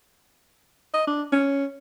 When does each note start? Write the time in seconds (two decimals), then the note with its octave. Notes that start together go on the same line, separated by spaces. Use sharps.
0.93 D#5
1.07 D4
1.32 C#4